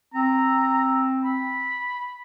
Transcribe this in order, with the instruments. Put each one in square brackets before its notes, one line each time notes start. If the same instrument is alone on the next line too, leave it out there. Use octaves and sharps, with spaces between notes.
[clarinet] C4 [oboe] A#5
[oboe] B5